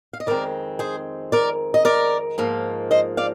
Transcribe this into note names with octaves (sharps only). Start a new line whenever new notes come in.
F5
D#5
F2 D#3 G#3 C4 A#4 D5
G#4 C5
A#4 D5
D#5
A#4 D5
G#2 F3 A#3
C5 D#5
D5 F5